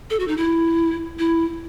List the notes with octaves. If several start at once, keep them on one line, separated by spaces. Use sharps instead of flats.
A4
F#4
D#4
E4
E4